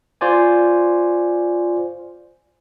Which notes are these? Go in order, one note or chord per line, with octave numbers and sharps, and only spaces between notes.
F4 C5 D5 G#5